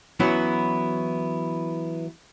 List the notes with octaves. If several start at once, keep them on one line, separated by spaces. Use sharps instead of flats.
E3 F#3 B3 C#4 E4